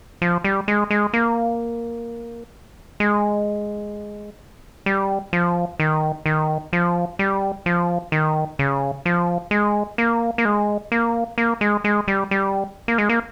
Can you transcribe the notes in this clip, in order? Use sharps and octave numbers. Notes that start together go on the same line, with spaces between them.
F3
G3
G#3
G#3
A#3
G#3
G3
F3
D#3
D#3
F3
G3
F3
D#3
C#3
F3
G#3
A#3
A#3
G#3
A#3
A#3
G#3
G#3
G3
G3
A#3
G#3
A#3